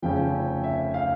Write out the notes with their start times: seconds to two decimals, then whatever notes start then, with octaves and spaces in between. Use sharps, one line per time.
0.02 F1 F2 C#3 F3 C#4 G5
0.63 E5
0.94 F5